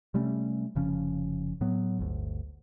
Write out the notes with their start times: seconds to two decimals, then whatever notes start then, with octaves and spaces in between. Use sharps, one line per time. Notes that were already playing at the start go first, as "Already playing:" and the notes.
0.14 C3 G3 A3 C#4
0.75 F1 C#3 F3 C#4
1.61 A2 F#3 B3
1.99 G1 D2